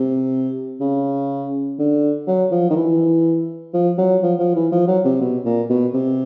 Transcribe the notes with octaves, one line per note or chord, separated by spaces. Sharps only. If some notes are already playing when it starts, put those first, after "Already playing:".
Already playing: C3
C#3
D3
F#3
F3
D#3
E3
F3
F#3
F3
F3
E3
F3
F#3
C3
B2
A#2
B2
C3